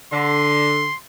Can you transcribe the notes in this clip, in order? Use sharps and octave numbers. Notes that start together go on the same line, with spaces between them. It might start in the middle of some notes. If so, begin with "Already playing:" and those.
D3 C6